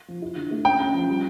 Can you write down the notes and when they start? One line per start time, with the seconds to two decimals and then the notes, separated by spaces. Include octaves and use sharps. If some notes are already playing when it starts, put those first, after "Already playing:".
0.08 F3
0.22 E4
0.36 D3
0.51 A3
0.65 C#4 G5
0.79 C#4
0.94 F3
1.08 G3